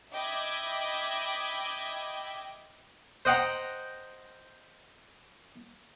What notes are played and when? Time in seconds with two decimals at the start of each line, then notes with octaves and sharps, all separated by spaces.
0.13 D#5 E5 G5 B5 D6 G#6
3.25 C5 D#5 F#5 G5 A#5 C6